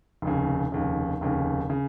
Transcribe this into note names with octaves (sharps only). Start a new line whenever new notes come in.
F1 D#2 C#3
F1 D#2 C#3
F1 D#2 C#3
C#3